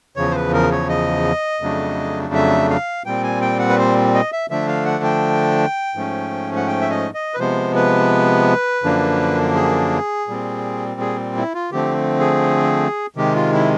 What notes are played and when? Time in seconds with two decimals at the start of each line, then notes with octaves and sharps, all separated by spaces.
0.16 E2 C#3 F3 C#5
0.31 C5
0.36 B4
0.54 A#4
0.72 C#5
0.89 D#5
1.61 F2 C#3 F#3 A3 D4
2.34 E5
2.70 F5
3.06 A#2 G3 C4 G5
3.23 G#5
3.41 G5
3.59 F#5
3.69 B4
3.79 C5
4.14 D#5
4.32 E5
4.50 D3 F3 A3 D4 E5
4.68 F5
4.86 F#5
5.04 G5
5.95 G#2 F3 A3 C#4
6.56 F#5
6.67 G5
6.81 E5
6.90 D#5
7.14 D#5
7.34 B4
7.38 C3 F3 G#3 B3 C5
7.76 B4
8.83 F#2 D3 F3 A#3 D4
9.55 G#4
10.28 A#2 G3 C4
11.01 G#4
11.37 E4
11.54 F4
11.72 D3 F3 A3 C4 G4
12.20 G#4
13.16 C3 D#3 G#3 G4
13.35 F4
13.53 E4